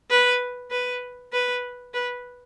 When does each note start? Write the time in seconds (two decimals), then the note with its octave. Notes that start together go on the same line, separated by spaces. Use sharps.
0.11 B4
0.71 B4
1.33 B4
1.94 B4